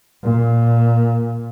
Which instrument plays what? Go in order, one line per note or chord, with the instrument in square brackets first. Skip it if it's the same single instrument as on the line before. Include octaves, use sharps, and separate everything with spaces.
[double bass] A#2